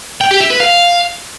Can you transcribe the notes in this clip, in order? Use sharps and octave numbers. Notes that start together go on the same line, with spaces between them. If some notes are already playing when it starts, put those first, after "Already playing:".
G5
G4
E5
B4
F5